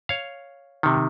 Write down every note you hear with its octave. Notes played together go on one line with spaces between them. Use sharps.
C#5 F5
C3 D#3